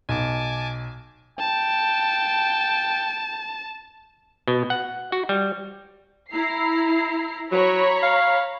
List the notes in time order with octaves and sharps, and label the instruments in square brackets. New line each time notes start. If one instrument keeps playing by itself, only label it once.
[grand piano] B1 [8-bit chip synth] G#5 A5 D6
[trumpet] G5 [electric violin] A5
[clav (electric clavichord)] B2
F#5
F#4
G3
[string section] E4 A#5 C7
[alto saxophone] F#3 [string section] C#5 A#5 B5
[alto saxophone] F5